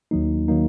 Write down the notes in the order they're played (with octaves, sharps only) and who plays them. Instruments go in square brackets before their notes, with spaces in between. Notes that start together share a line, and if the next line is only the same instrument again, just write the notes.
[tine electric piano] D#2 D#3 F#3 A#3 D#4
D#3 F#3 A#3 D#4